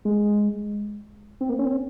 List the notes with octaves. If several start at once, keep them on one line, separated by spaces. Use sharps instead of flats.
G#3
C4
A#3
C#4
C4